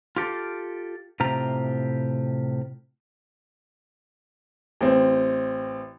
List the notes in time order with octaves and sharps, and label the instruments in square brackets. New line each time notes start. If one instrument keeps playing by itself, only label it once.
[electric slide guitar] F4 G4 A4
A2 C3 F4 G4 A#5
[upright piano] A1 C4